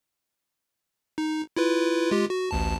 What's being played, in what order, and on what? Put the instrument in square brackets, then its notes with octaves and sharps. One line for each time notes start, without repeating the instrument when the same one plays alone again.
[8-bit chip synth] D#4
E4 F4 B4
G#3 F4 G4
F#4
A1 D2 A5